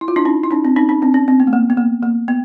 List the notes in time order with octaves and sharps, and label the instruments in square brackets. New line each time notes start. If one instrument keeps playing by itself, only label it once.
[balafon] E4
F4
D4 E4
C#4 D#4
E4
C#4 D#4
C4 D4
C#4 D#4
C#4 D#4
C4 D4
C#4
C4
B3
A3
A#3
B3
A#3
A#3
B3